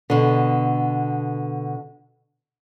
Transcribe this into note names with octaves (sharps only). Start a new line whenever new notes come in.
B2 D3